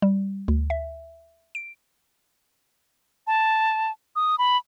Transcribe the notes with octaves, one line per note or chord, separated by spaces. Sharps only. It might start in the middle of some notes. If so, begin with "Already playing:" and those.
G3
D2
E5
D7
A5
D#6
B5